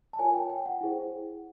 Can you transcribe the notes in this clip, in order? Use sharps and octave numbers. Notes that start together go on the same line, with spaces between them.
A5
F4 A#4 C#5 G#5
G5
G5
F#5
E4 G#4 C5